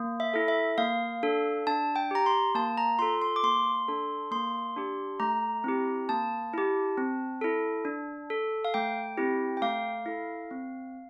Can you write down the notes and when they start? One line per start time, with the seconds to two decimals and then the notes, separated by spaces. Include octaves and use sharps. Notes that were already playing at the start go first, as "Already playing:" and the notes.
Already playing: A#3
0.20 E5
0.34 E4 A4
0.48 E5
0.78 A#3 F5
1.23 D4 A4
1.67 D4 A5
1.96 G5
2.11 G4 A#5
2.26 C6
2.55 A#3 A5
2.78 A#5
2.99 F4 A4 C6
3.22 C6
3.36 D6
3.43 A#3 C6
3.88 D4 A4
4.31 A#3 C6
4.76 D4 G4
5.20 A3 A#5
5.64 C4 E4 G4
6.09 A#3 A5
6.53 E4 G4
6.98 C4
7.41 E4 A4
7.85 D4
8.30 A4
8.65 F5
8.74 A3 G5
9.18 C4 E4 G4
9.57 G5
9.62 A3 F5
10.06 E4 A4
10.51 C4